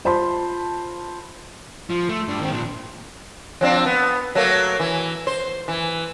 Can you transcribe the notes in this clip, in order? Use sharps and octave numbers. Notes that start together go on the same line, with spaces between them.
F4 C5 A5 B5 C6
F3
A3
G2 D4
D#3 C4
A#2 D4
F3 C4 D4
B3
F#3 A3 A#3
E3
C5
E3